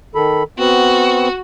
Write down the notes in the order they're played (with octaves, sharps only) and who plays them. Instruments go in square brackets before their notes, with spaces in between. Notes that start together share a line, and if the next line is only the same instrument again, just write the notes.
[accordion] D#3 A4 B5
[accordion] B3 C4 [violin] F#4